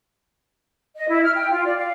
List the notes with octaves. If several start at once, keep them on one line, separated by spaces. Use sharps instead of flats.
D#5
E4
F6
G5
F4
D5
F5